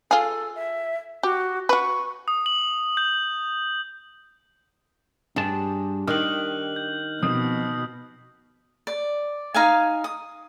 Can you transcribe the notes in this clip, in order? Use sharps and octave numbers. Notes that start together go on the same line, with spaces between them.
F4 G#4 A4
E5
F#4 G4
F#4 B4 C#6
D#6
F#7
G6
G2 D4 G#4 A5
D#3 D4 G4 D#5 F6 F#6 F#7
G6
B2 F3 C4 D#6
D5
D#4 F5 G#5
D#6